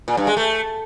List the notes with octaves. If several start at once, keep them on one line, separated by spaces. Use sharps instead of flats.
A#2
G2
G#3
A3